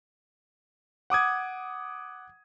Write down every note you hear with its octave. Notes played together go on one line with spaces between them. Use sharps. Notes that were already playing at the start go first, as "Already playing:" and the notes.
F#5 D6 D#6 G#6